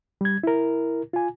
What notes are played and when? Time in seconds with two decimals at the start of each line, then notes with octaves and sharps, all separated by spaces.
0.21 G3 G#6
0.43 E4 A#4
1.13 F4 G#5